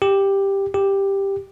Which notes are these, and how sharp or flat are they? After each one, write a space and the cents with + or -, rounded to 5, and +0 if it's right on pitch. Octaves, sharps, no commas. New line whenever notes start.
G4 +5
G4 +5